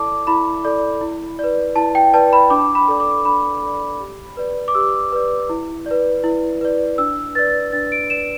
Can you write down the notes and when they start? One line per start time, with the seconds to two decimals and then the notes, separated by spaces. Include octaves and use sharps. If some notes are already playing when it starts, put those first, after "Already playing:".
Already playing: E4 A4 D5 A5 D6
0.27 E4 B5
0.65 A4 D5
1.01 E4
1.39 B4 D5
1.76 E4 A5
1.95 G5
2.14 B4 D5 A5
2.33 B5
2.50 D4 D6
2.75 B5
2.88 A4 D5
3.00 D6
3.25 D4 B5
3.62 A4 D5
4.00 G4
4.37 B4 D5
4.68 D6
4.75 G4 E6
5.12 B4 D5
5.50 E4
5.86 B4 D5
6.24 E4
6.61 B4 D5
6.98 D4 E6
7.35 B4 D5 A6
7.72 D4 A6
7.92 D7
8.10 B4 D5 E7